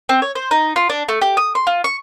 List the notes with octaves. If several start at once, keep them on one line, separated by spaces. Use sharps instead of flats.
C4
C#5
C5
D#4
F4
D4
A3
G4
D#6
C6
F4
C#6